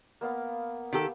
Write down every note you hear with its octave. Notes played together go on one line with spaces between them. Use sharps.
A#3 B3 F5
D#3 G4 A4